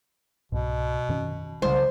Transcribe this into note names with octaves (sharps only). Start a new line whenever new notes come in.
C2 G#2 B2
F#2 D#3 C#4
C2 C#3 F#3 G#3 C5